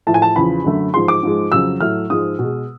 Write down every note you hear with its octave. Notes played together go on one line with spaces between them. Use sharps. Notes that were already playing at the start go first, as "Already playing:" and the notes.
A2 F3 A3 A5
G#5
A5
E2 C#3 F3 B5
F#2 D3 F#3 A3
G#2 F3 G#3 C6
D6
G#2 F3 G#3
F2 C#3 F#3 E6
A2 F#3 A3 F6
G#2 F3 G#3 D#6
B2 G#3